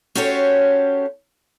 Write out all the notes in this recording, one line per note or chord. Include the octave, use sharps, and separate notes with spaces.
C#4 F#4 G4 A4 C5 C#5